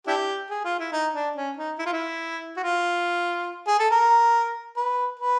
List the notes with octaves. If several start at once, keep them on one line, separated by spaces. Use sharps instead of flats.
D4 E4 G4
G#4
F4
E4
D#4
D4
C#4
D#4
E4
F4
E4
F#4
F4
G#4
A4
A#4
B4
B4